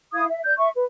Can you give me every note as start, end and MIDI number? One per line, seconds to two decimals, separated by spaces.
0.13 0.24 64
0.13 0.24 77
0.13 0.24 87
0.13 0.24 92
0.28 0.40 76
0.45 0.54 74
0.45 0.54 91
0.58 0.68 76
0.58 0.68 85
0.74 0.84 71